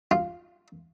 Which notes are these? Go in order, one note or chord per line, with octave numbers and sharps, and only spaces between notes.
F4